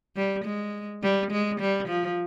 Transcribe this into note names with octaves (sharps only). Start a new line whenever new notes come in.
G3
G#3
G3
G#3
G3
F3